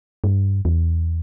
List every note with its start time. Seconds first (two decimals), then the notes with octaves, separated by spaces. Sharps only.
0.24 G2
0.65 E2